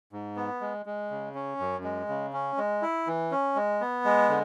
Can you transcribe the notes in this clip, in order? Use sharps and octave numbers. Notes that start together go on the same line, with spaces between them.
G#2
B3
G#3
G#3
C#3
C#4
F#2
G#3
C#3
C#4
G#3
E4
E3
C#4
G#3
B3
G#3
D3